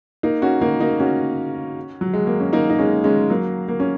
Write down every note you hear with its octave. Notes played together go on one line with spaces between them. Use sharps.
A#3 D#4
C#4 F#4
A#3 D#4
A#3 D#4
C#4 F#4
F#3
G#3
A#3
C#4
A#3 D#4
D#4
G#3 C#4
G#3 C#4
F#3 A#3
A#3
C#4